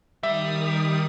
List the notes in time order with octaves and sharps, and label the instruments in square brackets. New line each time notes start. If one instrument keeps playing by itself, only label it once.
[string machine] D#3 D#6 [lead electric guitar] G3 [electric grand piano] E5